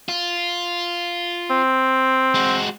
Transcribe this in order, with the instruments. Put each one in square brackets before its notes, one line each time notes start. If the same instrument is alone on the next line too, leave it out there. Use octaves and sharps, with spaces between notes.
[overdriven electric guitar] F4
[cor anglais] C4
[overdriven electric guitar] G#3 F#4